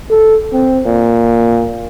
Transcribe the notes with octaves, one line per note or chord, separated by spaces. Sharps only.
A4
C4
A#2